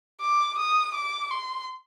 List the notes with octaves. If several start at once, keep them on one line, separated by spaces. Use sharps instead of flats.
D6
D#6
D6
C6